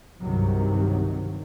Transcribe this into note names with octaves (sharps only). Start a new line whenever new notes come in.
C2 G2 C3 D#3 F#3